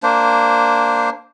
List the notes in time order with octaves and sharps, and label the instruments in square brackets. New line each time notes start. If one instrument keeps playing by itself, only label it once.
[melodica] A#3 D4 C5